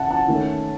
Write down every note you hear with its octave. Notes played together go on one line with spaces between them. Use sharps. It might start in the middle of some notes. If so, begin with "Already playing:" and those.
Already playing: C#3 E5 F#5 A5
F#5 A5
D#3 A3 C#4